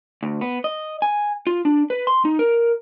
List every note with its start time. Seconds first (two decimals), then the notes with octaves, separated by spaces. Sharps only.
0.23 D2
0.41 B3
0.64 D#5
1.02 G#5
1.47 F4
1.65 D4
1.90 B4
2.07 C6
2.25 D#4
2.39 A#4